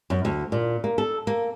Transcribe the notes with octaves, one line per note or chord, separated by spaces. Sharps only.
F#2
D2
A#2
A#3
A4
A#3